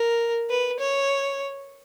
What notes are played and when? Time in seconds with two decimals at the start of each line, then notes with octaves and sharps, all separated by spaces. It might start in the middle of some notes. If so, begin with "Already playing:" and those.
Already playing: A#4
0.50 B4
0.79 C#5